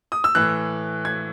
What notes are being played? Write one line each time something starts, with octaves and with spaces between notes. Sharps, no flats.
D#6
E6
A2 E3 F#6
G#6